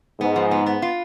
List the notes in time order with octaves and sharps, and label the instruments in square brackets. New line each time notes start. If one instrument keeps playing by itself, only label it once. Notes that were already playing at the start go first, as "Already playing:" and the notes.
[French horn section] G#2 [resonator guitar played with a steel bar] B3
[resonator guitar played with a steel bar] F3
B3
B3
F4